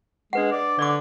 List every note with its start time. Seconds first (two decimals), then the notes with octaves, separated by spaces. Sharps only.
0.33 G#3 D4 B4 F#5
0.52 D5
0.79 D3 D5 D6